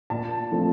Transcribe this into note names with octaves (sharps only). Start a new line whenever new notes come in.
A#2 A5
F3 A3 C4